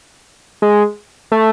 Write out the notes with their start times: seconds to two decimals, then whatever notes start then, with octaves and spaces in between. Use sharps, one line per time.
0.62 G#3
1.32 A3